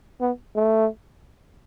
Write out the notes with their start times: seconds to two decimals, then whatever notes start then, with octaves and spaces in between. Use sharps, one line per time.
0.21 B3
0.56 A3